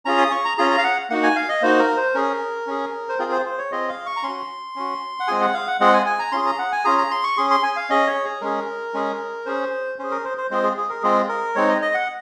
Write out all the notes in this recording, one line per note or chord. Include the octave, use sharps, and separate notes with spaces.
C#4 F4 G#4 A#5
D#6
C#6
A#5
C#4 F4 G#4 A#5
A#5
F5
F#5
A#3 D#4 F#4 F#5
G#5
F5
D#5
A#3 D#4 F#4 C5
A#4
C5
C#4 G#4 A#4
C#4 G#4
C5
C4 F4 G#4 A#4
C5
C5
C#5
C4 F4 G#4 D#5
F5
C#6
A#5
C#4 F#4 C6
C#4 F#4
F#5
G#3 C4 F4 G#4 G#5
F#5
F5
F#5
G#3 C4 F4 G#4 F#5
G#5
G#5
A#5
C#4 F4 G#4 C6
A#5
F#5
G#5
C#4 F4 G#4 A#5
A#5
C6
C#6
C#4 G#4 C6
C6
G#5
F5
C#4 G#4 D#5
C#5
G#4
G#3 C#4 G#4 A#4
G#3 C#4 G#4
C#4 G#4 C5
C#4 G#4 C5
A#4
C5
C5
G#3 C4 F4 G#4 C5
G#4
G#4
A#4
G#3 C4 F4 G#4
A#4
G#3 C4 D#4 C#5
D#5
D#5
F#5